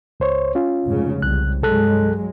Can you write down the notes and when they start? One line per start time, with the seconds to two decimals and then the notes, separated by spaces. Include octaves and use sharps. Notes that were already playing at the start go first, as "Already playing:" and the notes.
0.20 C#2 C5 C#5
0.55 C#4 F4
0.86 F1 G#2 C#3
1.22 C2 F#6
1.63 C2 G2 F#3 G#3 A4 F#6